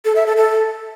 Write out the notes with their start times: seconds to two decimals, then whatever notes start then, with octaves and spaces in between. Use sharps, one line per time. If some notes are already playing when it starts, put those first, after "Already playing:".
0.05 A4
0.16 E5
0.26 A4
0.37 A4